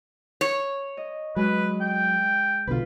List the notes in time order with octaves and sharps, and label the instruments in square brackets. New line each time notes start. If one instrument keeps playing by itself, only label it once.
[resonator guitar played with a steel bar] C#5
[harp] D#5
[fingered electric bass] F#3 [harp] G#3 [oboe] B4
[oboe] G5
[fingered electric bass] B1 B2 D3 [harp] F4 B4